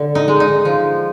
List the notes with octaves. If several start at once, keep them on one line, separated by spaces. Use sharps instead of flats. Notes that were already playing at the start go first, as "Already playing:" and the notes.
Already playing: D3
D#4
G#3
D#4
F3